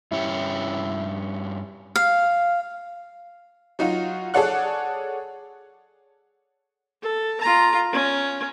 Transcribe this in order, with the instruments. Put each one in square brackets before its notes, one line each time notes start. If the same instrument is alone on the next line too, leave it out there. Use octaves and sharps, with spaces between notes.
[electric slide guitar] G2 C#4 G4 [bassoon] E4
[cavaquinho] F5
[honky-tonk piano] F#3 D#4 F4 F#4
G#4 A4 C#5 D5 F#5 F#6
[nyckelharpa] A4
F4 A#5
C#4